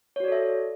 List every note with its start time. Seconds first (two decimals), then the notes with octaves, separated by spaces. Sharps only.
0.16 C#5
0.20 F#4
0.24 D5
0.28 A4
0.32 E5